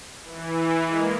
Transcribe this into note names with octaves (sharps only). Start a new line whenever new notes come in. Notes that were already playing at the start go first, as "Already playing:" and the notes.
E3
G#3 A#3